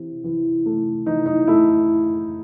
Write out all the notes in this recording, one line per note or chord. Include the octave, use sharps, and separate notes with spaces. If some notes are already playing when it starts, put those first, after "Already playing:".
Already playing: C3 E3
E3
A3
E3 D#4
D#4
A3 E4